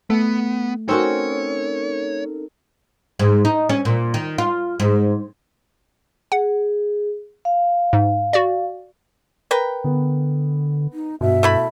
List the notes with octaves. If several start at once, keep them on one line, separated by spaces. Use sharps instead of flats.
A3 B3
C4 C#4 D#4 F#4 A4 A#4 C#5
G#2
D#4
C#4
A#2
D#3
F4
G#2
G#4 F#5
F5
G#2
F#4 D5
A#4 B4 G5
D3 B3
D#4
G2 B2 E5
A3 E4 B5